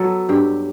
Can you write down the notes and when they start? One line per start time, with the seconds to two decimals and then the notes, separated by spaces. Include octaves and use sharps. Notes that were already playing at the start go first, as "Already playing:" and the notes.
Already playing: F#3 B3 A4 B4
0.29 G2 G4